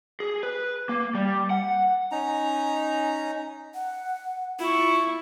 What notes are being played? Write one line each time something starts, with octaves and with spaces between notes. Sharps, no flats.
G#4
B4
A#3
G3
F#5
C#4 D#4 A#5
F#5
E4 F4 C#6